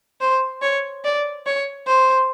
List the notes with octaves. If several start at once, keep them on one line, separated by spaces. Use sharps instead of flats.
C5
C#5
D5
C#5
C5